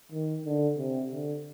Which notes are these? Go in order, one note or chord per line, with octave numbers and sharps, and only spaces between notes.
D#3
D3
C3
D3